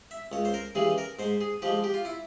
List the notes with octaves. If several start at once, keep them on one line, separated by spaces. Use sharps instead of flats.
E5
C#2 C#5
C5
A#4
C#3 E3 G3 G#4
A#4
G#2 C5
G#4
F3 G#3 G4
G4
F4
E4